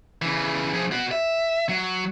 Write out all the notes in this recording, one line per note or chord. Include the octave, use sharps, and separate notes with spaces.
C#3 E3
F3 G#4
B3 F#4
E5
F#3